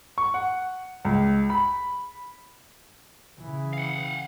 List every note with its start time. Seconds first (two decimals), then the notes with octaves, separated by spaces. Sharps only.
0.18 C#6
0.34 F#5
1.05 C#2
1.50 B5
3.39 C#3 E3
3.73 F5 F#5